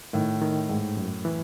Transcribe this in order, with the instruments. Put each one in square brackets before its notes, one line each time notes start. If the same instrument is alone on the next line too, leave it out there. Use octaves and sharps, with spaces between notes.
[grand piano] A2 [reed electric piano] D#3
[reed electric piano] D#3
G#2
F#2
E3